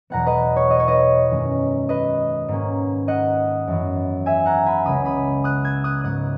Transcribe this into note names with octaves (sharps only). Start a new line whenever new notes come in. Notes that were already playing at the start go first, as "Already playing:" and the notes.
E2 B2 F#3 B3 F#5 A#5
B4 D#5
C#5
D#5
C#5
B4 D#5
F#2 D#3 G#3 C#4
B4 D#5
G#2 D#3 A#3 C#4
D#5 F#5
F#2 E3 B3
E5 G#5
F#5 A#5
G#5 B5
C#2 C#3 G#3 B5 D#6
B5 D#6
D#6 F#6
E6 G#6
D#6 F#6
G#2 F#3 B3 D#6 F#6